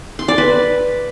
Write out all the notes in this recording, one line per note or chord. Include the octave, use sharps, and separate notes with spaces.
C6
D5
B4